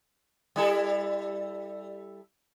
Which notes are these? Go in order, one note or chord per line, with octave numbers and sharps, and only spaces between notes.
G3 E4 A4